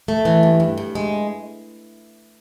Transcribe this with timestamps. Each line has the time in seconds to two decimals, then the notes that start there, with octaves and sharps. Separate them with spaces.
0.08 A3
0.25 E3
0.43 G2
0.60 G2
0.78 G2
0.95 G#3